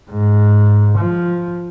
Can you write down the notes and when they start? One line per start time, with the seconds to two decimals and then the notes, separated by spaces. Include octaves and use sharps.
0.10 G#2
0.98 F3